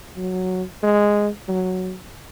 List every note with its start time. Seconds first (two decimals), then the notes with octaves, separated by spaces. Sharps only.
0.17 F#3
0.83 G#3
1.48 F#3